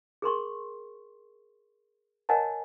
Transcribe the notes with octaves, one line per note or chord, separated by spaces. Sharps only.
G#4 A#4 C6 C#6
A#4 C#5 D#5 F#5 G#5 A5